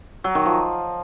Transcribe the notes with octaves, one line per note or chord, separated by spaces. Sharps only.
F#3
D#3
F3